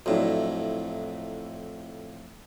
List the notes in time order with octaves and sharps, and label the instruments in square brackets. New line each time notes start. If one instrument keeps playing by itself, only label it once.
[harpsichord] F2 A2 [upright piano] F#3 D4 E4